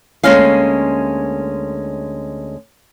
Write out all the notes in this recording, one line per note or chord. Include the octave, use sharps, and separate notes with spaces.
D2 B2 G#3 A#3 C#4 F5